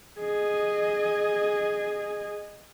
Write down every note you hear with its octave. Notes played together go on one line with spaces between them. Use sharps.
G#4 D#5